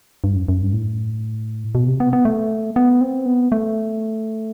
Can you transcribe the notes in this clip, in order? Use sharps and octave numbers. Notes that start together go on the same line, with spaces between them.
G2
F#2
F#2
G2
A2
B2
C3
B3
B3
A3
B3
C4
B3
A3